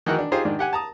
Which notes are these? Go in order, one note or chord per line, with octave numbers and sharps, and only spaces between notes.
D#3 E3 D#4 F#4 A#4 F#5
D4
D#4 F4 G4 G#4 C5
G#2 D#3 D4
G4 F#5 G#5
A5 A#5 D#6